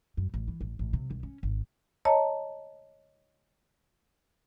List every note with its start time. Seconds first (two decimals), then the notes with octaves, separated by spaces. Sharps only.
0.17 F#2
0.34 A1
0.48 E3
0.61 A1
0.79 A1
0.93 C3
1.11 C2
1.23 C#4
1.43 G#1
2.05 C#5 D#5 A5 A#5